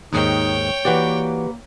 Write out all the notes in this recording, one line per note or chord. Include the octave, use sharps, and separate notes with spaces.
D#2 G#2 D#3 D#4 C#5 G5
E3 A#3 F#4 G4 B4 D5 F#5